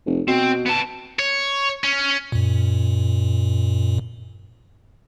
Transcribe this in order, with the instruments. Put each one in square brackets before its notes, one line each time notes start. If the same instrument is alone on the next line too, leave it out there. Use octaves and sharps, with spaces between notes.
[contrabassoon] F1
[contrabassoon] B2 [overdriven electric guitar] C4
[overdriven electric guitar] B3 A5
[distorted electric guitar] C#5
C#4
[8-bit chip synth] F#2 A#2